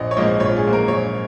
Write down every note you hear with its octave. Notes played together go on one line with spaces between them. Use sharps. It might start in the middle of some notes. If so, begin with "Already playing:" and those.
Already playing: A#1 D#5
C#5
G#2 F3 A#3 D#5
A#1 C#5
F4
G#4
G#2 F3 A#3
A#4
A#1 C#5